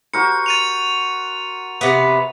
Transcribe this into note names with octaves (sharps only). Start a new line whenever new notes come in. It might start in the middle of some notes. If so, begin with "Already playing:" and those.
F#4 A#4 C5 C#7
A6 D#7 F7
C3 B3